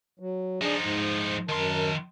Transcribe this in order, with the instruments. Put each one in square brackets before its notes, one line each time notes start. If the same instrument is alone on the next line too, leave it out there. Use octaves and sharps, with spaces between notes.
[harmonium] F#3
[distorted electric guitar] F3 D#4 [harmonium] D4 G#4
[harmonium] G#2
[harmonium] F#2 A#4 A5 [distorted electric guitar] D#3 C6